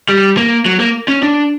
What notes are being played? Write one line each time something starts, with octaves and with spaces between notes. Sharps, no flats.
G3
A#3
F#3
A#3
C#4
D4